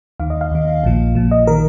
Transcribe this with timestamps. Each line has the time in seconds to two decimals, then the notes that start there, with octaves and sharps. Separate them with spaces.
0.20 D#2 D#3 F5
0.30 D#5
0.41 F5
0.51 D#2 D#3
0.84 A#1 A#2 F3
1.15 A#1 A#2 F3
1.31 D#5
1.47 D#3 A#4